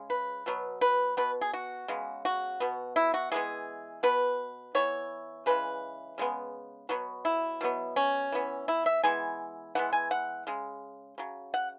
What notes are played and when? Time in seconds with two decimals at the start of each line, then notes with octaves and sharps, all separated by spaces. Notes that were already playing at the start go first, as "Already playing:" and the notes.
Already playing: C#3 G#3
0.10 B4
0.46 B2 F#3 B3
0.81 B4
1.17 B2 B3 B4
1.41 G#4
1.53 F#4
1.88 C#3 G#3 B3
2.25 F#4
2.60 B2 B3
2.96 E4
3.14 F#4
3.32 E3 G#3 B3 G#4
4.03 B2 B3 B4
4.75 E3 B3 C#5
5.46 C#3 E3 G#3 B4
6.18 C#3 G#3 B3
6.89 B2 F#3 B3 F#4
7.25 E4
7.61 B2 F#3 B3
7.96 C#4
8.32 E3 B3
8.68 E4
8.86 E5
9.03 E3 G#3 B3 G#5
9.75 E3 G#3 B3 F#5
9.93 G#5
10.11 F#5
10.47 C#3 G#3
11.18 C#3 F#3
11.54 F#5